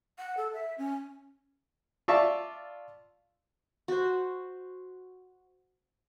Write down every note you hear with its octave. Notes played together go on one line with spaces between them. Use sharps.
F#5
A4
E5
C#4
F4 D5 E5 A5 C#6
F#4 C5